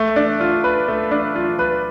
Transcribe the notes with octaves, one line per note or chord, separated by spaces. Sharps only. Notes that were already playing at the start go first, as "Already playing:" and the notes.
Already playing: A3
D4
F4
B4
A3
D4
F4
B4